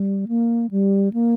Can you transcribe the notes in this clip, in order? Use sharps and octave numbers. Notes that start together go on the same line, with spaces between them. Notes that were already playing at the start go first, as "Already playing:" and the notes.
Already playing: G3
A#3
G3
A#3